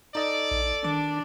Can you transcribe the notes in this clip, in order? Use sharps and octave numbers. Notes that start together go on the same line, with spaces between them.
D#4 A4 D5 D#5
A#1
D#3 D4 D6